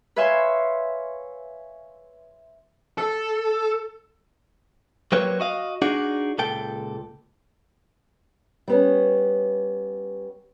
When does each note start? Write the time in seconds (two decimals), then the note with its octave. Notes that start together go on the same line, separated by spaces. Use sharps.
0.16 B4 C#5 E5 F5 G#5 C6
2.98 A4
5.12 F#3 A#3 C4 G4 B4 C#5
5.40 F#4 D#5 F5
5.82 D4 D#4 F#4 G#4 D5
6.38 C#2 A#2 A4 G5
8.68 G3 B3 C#4